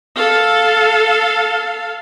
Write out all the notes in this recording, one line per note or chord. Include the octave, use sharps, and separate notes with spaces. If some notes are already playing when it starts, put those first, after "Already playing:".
A4 F5